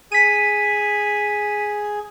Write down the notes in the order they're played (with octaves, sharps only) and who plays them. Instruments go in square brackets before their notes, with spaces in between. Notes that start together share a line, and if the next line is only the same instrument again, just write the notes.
[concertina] G#4 [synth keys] B6 D#7